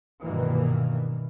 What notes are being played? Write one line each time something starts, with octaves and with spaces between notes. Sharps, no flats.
C2 G2 B2 D#3 E3 A#3